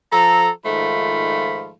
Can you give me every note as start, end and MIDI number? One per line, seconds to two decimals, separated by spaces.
0.11 0.49 53
0.11 0.49 69
0.11 0.49 82
0.65 1.71 44
0.65 1.71 51
0.65 1.71 53
0.65 1.71 57
0.65 1.71 65
0.65 1.71 83